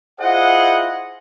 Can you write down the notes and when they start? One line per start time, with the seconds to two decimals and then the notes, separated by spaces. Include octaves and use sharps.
0.20 E4 F4 G#4 C5 D#5 F#5